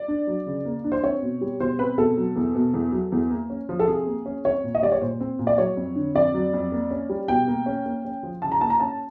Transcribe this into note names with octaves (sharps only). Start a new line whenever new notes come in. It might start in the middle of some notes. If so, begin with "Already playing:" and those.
Already playing: D5
D4
F#3
C#3
A#3
D4
C5
C4 C#5
B2
G3
B2 C5
C4 B4
B2 A4
F#3
E2
B2
E2
F#3
E2
A#3
C#4
F3
A4
C3 G#4
A#3
C#4
C4 C#5
A#2
D#5
G3 D5
C#5
A#2 C5
C4
A#2
D5
F#3 C#5
F2
D3
F2 D5
F#3
F2
A#3
C#4
G3
B2 G5
A#3
C#4
A#3
C#4
F3
C#3 A5
A#5
A#3 A5
A#5
C#4 A5